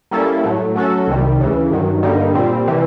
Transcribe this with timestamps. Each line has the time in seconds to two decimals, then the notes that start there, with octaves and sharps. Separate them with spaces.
0.11 G3 A#3 C#4 E4 A4
0.43 A2 F#3 A3
0.76 F#3 A3 C#4 F#4 A4
1.07 C2 C3 D#3 G3
1.39 D2 C#3 E3
1.71 G2 D#3 F#3
2.02 G2 D3 G3 A#3 D#4
2.34 A#2 G3 C4
2.67 C3 E3 G3